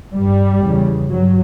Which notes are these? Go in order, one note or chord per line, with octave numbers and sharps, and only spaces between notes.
G2 G3
E2 C#3
G2 F#3